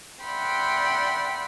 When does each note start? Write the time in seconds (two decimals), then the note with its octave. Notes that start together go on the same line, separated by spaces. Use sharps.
0.23 D5 E5 F#5 G5 B5 C6